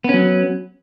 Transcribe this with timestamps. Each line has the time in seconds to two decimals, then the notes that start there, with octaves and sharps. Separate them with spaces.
0.04 B3
0.09 C#4
0.14 F#3